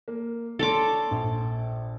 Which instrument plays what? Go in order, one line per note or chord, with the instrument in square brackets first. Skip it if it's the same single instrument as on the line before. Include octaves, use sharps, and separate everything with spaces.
[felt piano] A#3
[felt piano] D4 C6 [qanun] A4 C#5 D6
[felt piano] A#1